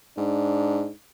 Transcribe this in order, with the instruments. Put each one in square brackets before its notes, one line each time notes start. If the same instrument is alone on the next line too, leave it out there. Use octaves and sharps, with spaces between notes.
[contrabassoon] G#2 [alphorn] D4